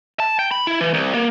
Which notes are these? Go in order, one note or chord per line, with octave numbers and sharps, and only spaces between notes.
A5
G5
B5
E4
E3
C2
A#3